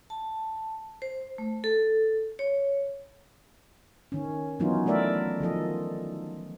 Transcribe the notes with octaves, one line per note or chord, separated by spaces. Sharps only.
A5
C5
A3
A4
C#5
D#3 C#4
E3 F#3 B3 C#4 D#4 F4
A3 D4 A#4 D5 E5
D#3 F3 A4 D#5